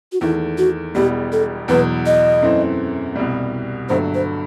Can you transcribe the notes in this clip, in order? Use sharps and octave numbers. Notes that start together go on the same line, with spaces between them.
F#4
E2 D#3 A3 E4
F#4
E1 E2 B2 G3 G4
A4
E2 B2 F#3 B4
D#5
F#2 E3 A3 C4
C2 B2 G3
G1 G2 F#3 A3 C5
C5